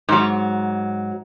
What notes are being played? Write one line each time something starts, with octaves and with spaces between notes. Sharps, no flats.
G#2 F#3